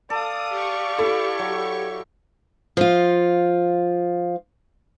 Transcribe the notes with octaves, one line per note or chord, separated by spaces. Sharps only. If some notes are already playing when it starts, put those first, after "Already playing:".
A4 D5 F5 D#6
G4 C#6
E4 A4
F#3
F3 F4